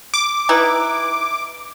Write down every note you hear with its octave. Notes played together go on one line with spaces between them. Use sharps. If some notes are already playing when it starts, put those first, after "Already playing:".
D6
D#4 E4 B4